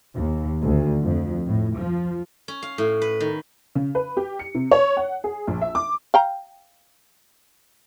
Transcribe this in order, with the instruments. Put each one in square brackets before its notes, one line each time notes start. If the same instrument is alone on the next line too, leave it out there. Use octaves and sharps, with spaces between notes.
[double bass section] D#2
D2
F2
A2
F3
[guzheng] C#4
F5
A2
B4
D#3
[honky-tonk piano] C#3
B4
G4
C#7
C3
C#5
F#5
G#4
A#1
E5
D6
[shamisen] F5 G5 A#5